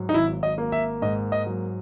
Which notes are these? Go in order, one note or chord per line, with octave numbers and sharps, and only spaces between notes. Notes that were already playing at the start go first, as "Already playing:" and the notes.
Already playing: G#2 F#3
D#4
G#1 E4
D#5
A#3
E5
G#2 D#5
D#5
F#3